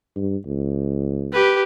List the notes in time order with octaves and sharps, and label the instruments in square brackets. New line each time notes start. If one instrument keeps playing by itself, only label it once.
[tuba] G2
C#2
[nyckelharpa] G4 B4